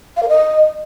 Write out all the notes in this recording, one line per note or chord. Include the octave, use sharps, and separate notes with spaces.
F5
A#4
D#5